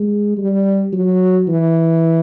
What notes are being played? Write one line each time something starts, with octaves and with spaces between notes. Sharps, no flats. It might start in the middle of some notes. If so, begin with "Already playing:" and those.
Already playing: G#3
G3
F#3
E3